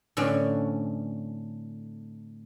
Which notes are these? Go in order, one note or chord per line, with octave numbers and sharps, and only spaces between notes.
A2 D3 C4 C#4